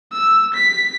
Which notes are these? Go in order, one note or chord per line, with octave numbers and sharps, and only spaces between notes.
E6
B6